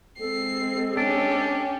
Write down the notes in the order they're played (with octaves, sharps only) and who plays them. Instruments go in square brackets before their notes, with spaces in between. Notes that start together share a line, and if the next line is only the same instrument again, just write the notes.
[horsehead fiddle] G#3 C4 [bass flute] A4 [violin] C7
[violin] C#4 G4 [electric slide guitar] D4